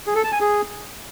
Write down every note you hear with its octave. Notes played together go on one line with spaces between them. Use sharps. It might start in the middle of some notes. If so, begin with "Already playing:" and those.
G#4
A4
A5
G#5
G#4